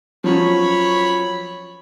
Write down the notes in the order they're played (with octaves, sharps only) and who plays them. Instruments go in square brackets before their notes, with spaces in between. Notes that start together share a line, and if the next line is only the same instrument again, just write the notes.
[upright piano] F3 F#3 C#4 [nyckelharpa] C#5 B5